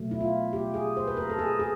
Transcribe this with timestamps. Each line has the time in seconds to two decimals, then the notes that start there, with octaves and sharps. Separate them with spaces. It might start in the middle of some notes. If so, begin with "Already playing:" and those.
Already playing: B2 F#3 A3
0.11 E4
0.20 F4
0.53 G4
0.74 G#4
0.97 C5
1.07 B4
1.17 A#4
1.30 A4
1.39 G#4
1.59 G#4